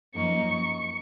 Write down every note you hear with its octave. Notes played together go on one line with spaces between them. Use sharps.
F#2 F3 A#3 D#4 C#6